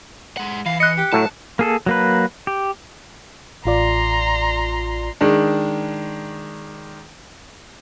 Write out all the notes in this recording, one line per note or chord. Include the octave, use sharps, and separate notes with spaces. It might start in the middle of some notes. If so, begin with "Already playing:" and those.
G#3 F#5
E3 F5
D#5 F#6 C#7
G4
A2 F#3 A3 A5
A#3 G#4 A4
F#3 A#3 B4
G4
A1 F4 D5 A#5 C6
D#3 G#3 D4